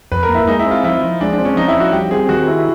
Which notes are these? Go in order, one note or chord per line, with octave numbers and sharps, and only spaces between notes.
F2 B4
A#4
A#3
E4
G#3 D#4
E4
C4
F4
F3 E4
F3
G#3 D4
D4
C4
C#4
F3 D#4
E4
F3
F#4
G3 G4
C4 G#4
D#3 F#4
E4